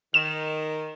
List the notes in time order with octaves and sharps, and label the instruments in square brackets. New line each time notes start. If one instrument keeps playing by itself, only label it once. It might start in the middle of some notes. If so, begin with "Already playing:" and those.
[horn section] D#3 [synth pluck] E7